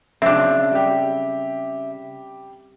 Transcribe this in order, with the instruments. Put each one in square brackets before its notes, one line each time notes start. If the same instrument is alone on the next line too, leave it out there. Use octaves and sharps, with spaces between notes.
[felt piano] B1 [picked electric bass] C#3 [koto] C4 D4 [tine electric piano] E5
[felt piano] G3 G4